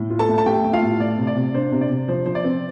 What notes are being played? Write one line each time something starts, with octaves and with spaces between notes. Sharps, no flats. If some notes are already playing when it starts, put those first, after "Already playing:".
Already playing: A2
F4
A4 A5
A3
A5
A3 G4 G5
A3
F4 F5
A2
A3 D5
C3
D5
C3
D4 C5
C3
D5
C3
F3 C5
F3 C5
D5
C4